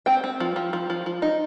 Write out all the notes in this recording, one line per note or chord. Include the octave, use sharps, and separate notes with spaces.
C4 G5
C4
F3
F3
F3
F3
F3
D#4